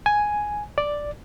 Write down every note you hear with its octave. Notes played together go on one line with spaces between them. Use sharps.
G#5
D5